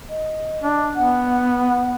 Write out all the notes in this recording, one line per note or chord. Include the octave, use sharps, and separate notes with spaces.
D#5
D4
B3 F#5